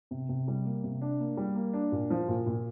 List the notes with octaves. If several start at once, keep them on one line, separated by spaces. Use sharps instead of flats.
C3
C3
G3
A#3
C3
D4
A#3
G3
A#3
D4
A#2
F3
A#2
A#2